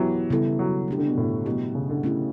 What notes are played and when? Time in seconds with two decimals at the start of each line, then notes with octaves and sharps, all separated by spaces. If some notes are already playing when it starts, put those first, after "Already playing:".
Already playing: E3 F#3 B3 E4 G4
0.30 C#3 G3 B3 E4 A4
0.59 F#3
0.88 A3 D4 G4
0.98 D3
1.07 B2
1.17 A2
1.46 B2 F#3 A3 E4 G4
1.75 C#3
1.89 D3
2.03 A3 C#4 E4 G4